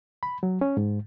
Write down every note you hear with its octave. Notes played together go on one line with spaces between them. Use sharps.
B5
F#3
C#4
G#2